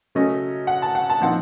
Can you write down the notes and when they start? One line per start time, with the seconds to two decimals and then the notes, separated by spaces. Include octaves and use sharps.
0.15 C#3 F#3 A3 C#4 D#5
0.67 F#5
0.82 A5
0.95 F#5
1.10 A5
1.20 A#2 F3 C4 D#4 F#5